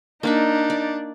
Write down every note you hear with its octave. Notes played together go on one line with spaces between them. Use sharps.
A#3 D4 D#4 D5 E5
D5